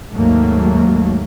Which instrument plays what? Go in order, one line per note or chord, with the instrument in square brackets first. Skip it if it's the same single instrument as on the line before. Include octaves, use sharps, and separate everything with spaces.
[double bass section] D#2 G#2 F#3 A3 A#3